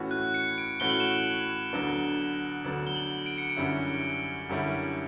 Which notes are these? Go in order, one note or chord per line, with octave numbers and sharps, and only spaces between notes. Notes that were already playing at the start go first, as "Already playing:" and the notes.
Already playing: A2 E3 A3 C#4 F#4
F#6
C#7
D7
A2 E3 A3 C#4 F#4 G7
F#7
E7
F#7
D2 D3 F#3 B3 D4
D2 D3 F#3 B3 D4
G7
F#7
D7
C#7
D7
F#2 D3 G3 C#4 E4
F#2 D3 G3 C#4 E4